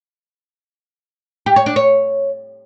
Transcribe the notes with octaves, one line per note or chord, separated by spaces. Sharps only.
G4
C#5
D4
C#5